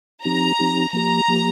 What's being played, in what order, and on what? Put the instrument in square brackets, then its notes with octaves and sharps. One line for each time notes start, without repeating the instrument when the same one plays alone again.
[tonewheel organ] F3 C4 D#4 G4 [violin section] A#5
[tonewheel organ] F3 C4 D#4 G4
[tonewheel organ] F3 A#3 G4 [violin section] A#5
[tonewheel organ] F3 A#3 G4